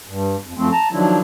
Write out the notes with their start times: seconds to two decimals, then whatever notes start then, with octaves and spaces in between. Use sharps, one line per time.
0.07 G2
0.45 F2
0.57 F#2 F3 A3 C4
0.72 A5 A#5
0.92 D#3 F3 F#3 D4 E4